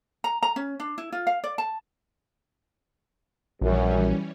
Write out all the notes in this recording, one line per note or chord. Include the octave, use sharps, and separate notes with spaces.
A#5
A#5
C#4
D4
E4
F4
F5
D5
A5
A#1 F#2 E3 G3 C#4